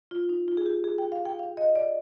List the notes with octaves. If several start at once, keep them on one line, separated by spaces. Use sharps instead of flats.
F4
D#4
F4
G#4
G4
G#4
G5
F5
G5
F5
D#5
D5